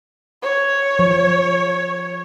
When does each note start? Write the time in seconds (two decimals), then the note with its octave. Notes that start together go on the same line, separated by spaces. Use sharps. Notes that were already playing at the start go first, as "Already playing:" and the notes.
0.42 C#5
0.99 F3